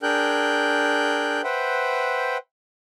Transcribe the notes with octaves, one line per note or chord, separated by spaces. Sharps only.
D4 G#4 A#4 G5 F#6 G6
B4 C5 E5 F#5 G5